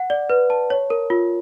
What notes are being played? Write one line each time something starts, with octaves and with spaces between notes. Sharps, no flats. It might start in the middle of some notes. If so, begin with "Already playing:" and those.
Already playing: F#5
D5
B4
A5
C#5
A#4
F4